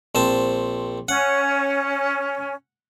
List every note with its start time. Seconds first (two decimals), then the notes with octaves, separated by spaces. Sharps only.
0.15 A#1 C4 A5
1.09 C#4 F#5